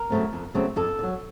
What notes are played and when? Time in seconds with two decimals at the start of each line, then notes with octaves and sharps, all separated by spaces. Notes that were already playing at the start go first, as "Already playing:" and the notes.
Already playing: A#4
0.10 C#3 F#3 A3 C4
0.33 F2
0.54 C#3 F#3 A3 C4
0.76 F2 A4
0.99 D3
1.03 F#3